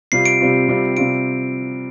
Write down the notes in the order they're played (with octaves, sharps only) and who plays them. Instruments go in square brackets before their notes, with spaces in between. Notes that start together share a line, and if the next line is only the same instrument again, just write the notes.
[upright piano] C3 G3 C4 F4 [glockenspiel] C7
[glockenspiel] D7
[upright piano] C3 G3 C4 F4
C3 G3 C4 F4
[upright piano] C3 G3 C4 F4 [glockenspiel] D7